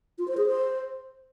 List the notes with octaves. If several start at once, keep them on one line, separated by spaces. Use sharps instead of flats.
F4
C5
G#4
C5